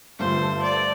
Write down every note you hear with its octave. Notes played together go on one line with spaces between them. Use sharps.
G2 D3 A3 F4 C5
D5